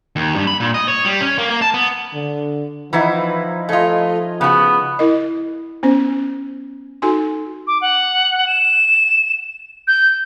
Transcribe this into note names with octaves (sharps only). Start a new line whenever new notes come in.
D#2
G2
B5
A#2
D#5
C#5
G3
C#4
A#3
A#3
A5
B3
D3
E3 F3 B3 D#4 E4
A3 F4 D#5 G#5
C#3 B3 F#4
E4 A#4 D#5
B3 C#4 C5
D#4 F#4 A4 G#5 C6
D6
F#5
E7
G6